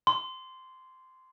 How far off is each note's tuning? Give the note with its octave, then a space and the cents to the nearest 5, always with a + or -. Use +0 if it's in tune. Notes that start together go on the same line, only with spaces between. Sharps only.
C6 -10